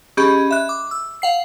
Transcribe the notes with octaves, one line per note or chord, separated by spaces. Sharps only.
C#4 G4 G#4 D#5 B5
E5 F#6
D6
E6
F5 F#5 C7